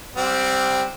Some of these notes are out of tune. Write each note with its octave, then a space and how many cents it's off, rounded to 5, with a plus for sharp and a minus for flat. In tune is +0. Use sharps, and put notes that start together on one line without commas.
G3 +0 C4 +0 F#5 -35